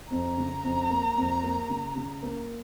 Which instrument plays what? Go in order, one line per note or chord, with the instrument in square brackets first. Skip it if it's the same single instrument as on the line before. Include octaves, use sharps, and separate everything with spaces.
[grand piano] F2 [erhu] A#5
[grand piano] C#3
F2
A#3
F2
A#3
C#3
C#3
A#3